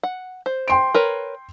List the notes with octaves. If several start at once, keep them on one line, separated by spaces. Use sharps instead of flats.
F#5
C5
G5 C6 D7
A#4 B4 C#5